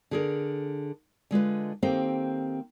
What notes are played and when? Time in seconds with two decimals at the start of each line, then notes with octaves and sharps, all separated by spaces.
0.11 D3 G#4 A#4
1.31 D3 G#3 F4 B4
1.82 D#3 A#3 C4 G4 A4 C5